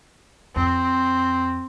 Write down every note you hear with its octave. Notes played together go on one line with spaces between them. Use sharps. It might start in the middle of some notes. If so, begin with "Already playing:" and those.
F2 C4